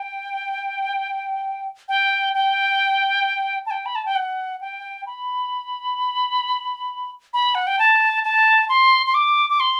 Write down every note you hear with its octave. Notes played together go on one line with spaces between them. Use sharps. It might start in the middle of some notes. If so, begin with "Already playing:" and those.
Already playing: G5
G5
G5
A5
G5
B5
A5
G5
F#5
G5
B5
B5
F#5
G5
A5
A5
C6
C6
D6
D6
C6